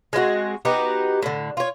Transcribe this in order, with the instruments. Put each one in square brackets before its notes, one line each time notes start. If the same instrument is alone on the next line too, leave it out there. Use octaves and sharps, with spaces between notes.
[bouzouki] G#3 C4 F4 F#4
B3 D#4 F#4 G4
A2 D3
F4 C#5